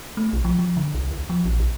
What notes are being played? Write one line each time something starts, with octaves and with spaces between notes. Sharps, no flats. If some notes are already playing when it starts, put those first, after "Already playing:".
A3
B1
F3
F3
D3
C2
D2
F3
A#1
B1